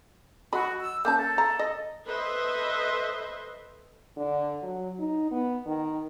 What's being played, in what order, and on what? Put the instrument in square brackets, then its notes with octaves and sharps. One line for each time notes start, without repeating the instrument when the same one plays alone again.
[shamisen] F#3 D#5 B5 [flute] F#4
[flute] E6
[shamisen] A#3 C#4 A5 [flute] G6
[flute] A4
[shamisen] A#5
D#5
[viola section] A4 B4 C5 D#5 E5
[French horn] D3
F#3
D#4
B3
D#3